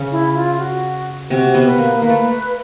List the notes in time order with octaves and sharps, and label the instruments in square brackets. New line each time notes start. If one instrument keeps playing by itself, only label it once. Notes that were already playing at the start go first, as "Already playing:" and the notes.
Already playing: [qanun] C#3 C#4
[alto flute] E4
F4
F#4
[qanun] C3 C4 [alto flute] F#4
[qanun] B2 B3
[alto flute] B4
[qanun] A#3
[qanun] A#3 [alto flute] B4
[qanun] A3